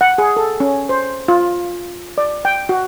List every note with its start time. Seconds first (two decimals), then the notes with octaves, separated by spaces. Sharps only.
0.01 F#5
0.18 G#4
0.37 A4
0.60 C#4
0.89 C5
1.28 F4
2.18 D5
2.45 G5
2.69 F#4